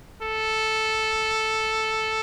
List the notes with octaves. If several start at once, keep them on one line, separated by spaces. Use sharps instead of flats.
A4